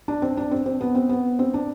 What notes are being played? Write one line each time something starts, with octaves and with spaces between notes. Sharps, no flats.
D4
C4
D4
C4
C4
B3
C4
B3
C4
D4